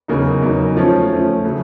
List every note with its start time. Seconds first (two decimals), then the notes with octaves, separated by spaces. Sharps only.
0.08 E2 C#3 F#3 A#3 D#4
0.42 E2 C#3 F#3 A#3 D#4
0.77 F3 A3 C#4
1.10 F3 A3 C#4
1.44 C#3 F#3 A3